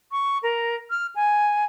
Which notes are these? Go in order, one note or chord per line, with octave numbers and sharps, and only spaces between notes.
C#6
A#4
F6
G#5